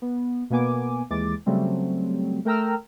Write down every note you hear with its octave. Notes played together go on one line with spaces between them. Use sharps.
B3
B2 A#3 B3 G#5 D6
D#2 E3 G#3 D6 A6
C#3 F#3 G3 A3 C4
A3 A#4 G5 A#5 E6 F6